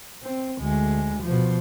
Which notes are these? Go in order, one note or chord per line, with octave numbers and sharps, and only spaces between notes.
C4
D2 G#3
B2 F3